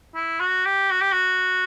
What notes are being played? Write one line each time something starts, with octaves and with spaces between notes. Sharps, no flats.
E4
F#4
G4
F#4
G4
F#4